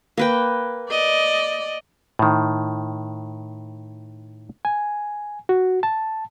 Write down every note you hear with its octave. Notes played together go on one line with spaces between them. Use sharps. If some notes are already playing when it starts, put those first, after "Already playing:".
A#3 B4 G5
D5 D#5
A2 D#3
G#5
F#4
A5